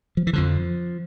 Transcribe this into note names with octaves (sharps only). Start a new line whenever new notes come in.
F3
E3
F2 D3 F3